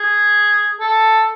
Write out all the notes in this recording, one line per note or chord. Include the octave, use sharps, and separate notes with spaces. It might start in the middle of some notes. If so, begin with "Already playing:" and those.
Already playing: G#4
A4